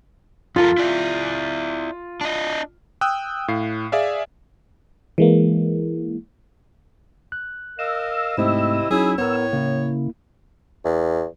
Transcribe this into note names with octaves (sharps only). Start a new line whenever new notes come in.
F2 F4 A4 A#4
E4 D5 E5
D4 D#5
G5 D#6 E6 F#6
A2 F5 C7
G#4 D5 E5 F5
E3 G#3 A#3
F#6
A#4 D#5 F5 E6
G#2 C3 A3 C4 E4 D#5
F#3 C#4 D#4 E4 G#4
A2 B3 A#4 C#5
C#3 A#3 E4
E2